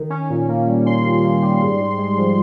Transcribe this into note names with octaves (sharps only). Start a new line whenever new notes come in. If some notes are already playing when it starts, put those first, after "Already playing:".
Already playing: D#3
C#4
A#2
A#3
G3
C#4 C6
A#2
A#3
G3
G#2
G#2
G#3
F3